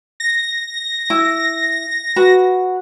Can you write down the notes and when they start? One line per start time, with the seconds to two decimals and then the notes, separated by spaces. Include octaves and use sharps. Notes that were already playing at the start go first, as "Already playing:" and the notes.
0.20 A#6
1.10 E4
2.16 F#4 B4